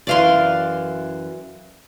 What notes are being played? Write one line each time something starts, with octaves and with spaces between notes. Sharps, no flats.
F#2 E3 D5 F5 C6